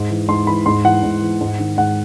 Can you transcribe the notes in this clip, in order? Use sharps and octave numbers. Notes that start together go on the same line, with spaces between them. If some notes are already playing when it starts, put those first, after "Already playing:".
Already playing: G#2
E3
G#2 C6
E3 B5
G#2 C6
E3 F#5
G#2
E3
G#2
D#3
G#2 F#5